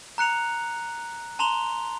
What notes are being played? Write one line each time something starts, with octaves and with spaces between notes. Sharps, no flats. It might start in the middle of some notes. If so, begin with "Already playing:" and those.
A#5 F#6 C#7 F7
A5 A#5 C6 F7 G7